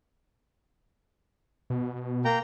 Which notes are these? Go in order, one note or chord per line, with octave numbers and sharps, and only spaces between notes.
B2
A#3 G5 A#5